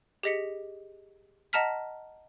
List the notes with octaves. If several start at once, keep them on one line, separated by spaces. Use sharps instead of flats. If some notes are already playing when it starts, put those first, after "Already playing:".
G4 G#4 D#5 B6 C#7
D#5 F#5 A5 A#5 F6 B6